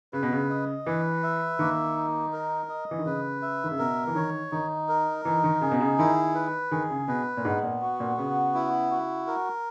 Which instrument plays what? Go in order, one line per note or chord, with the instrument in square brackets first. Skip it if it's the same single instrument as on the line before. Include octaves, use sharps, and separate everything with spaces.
[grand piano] C#3 [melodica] B4
[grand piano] B2
C#3
[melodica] D#5
[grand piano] E3 [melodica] B4
[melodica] E5
[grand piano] D#3 [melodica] A#3
[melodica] D#4
A#4
D#5
[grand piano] E3
D#3
[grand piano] C#3 [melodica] B4
[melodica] E5
[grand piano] D#3
C#3
[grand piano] B2 [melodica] A#4
[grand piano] E3
[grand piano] D#3 [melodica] C#5
[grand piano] D#3 [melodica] D#4
[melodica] A#4
[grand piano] E3 [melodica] D#4
[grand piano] D#3
[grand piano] C#3 [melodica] G#4
[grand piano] B2
C#3
[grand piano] D#3 [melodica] E4
[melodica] B4
[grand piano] D#3 [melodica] G#4
[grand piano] C#3
[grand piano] B2 [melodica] B4
[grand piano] A#2
[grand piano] G#2 [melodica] B3
[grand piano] A#2
[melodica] F#4
[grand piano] A#2
[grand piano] C#3 [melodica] B3
[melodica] E4
F#4
A#4